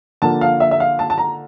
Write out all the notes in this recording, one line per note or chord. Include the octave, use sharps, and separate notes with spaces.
D3 F3 A#3 A5
F5
E5
E5
F5
A5
A5
A#5